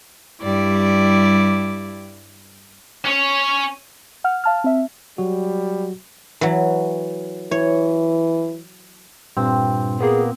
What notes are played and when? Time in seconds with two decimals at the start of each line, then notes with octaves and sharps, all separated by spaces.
0.41 G2 G3 E4 D5 D6
3.04 C#4 C#5
4.24 F#5 F6
4.44 F5 A5 F6
4.64 C4 E5
5.18 F#3 G3 F#4
6.41 E3 F#3
7.51 E3 C#5
9.37 G2 A#2 C4
10.00 A#3 B3 G#4